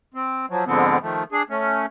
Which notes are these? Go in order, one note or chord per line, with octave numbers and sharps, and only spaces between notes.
C4
F3 F#3
F2 G#2 D3 F3 B3 C4
D#3 F3 A3
D4 G#4
A3 C#4